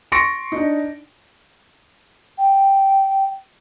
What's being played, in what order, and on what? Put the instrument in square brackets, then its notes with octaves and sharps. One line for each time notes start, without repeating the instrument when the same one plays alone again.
[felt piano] C6 C#6 A6 A#6 C#7 D7
D4 D#4
[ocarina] G5